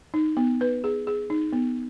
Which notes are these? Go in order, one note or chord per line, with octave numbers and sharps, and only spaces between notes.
D#4
B3
B4
G#4
G#4
D#4
B3